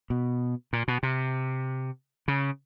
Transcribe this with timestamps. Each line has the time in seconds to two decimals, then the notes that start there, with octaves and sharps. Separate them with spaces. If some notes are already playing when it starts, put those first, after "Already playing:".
0.10 B2
0.73 A#2
0.88 B2
1.03 C3
2.28 C#3